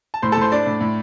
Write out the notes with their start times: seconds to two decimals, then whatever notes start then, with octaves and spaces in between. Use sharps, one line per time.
0.14 A5
0.22 A2 C5 C6
0.32 A4 A5
0.37 A2 C5 C6
0.52 D4 D5 D6
0.66 A2
0.81 A2